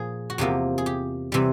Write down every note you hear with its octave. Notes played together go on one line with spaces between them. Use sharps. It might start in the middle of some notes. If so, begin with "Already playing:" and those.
Already playing: A#2 F3 G#4
F#4
E2 C3 F3 A#3 G4
G#4
G4
C3 E3 G3